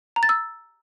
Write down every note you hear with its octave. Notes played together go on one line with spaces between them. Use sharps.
A#5
A6
E6